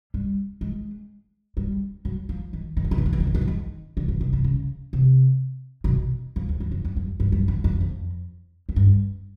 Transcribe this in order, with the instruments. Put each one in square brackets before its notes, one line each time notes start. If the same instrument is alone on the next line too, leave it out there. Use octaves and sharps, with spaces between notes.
[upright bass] G3
G#3
G3
F#3
F3
D#3
D#3
E3
D#3
E3
D#3
E3
D#3
E3
D#3
E3
D#3
D3
C#3
B2
C3
C#3
C3
C3
B2
F2
E2
F2
F2
F2
F#2
G2
F#2
F2
F2
F2
F#2
G2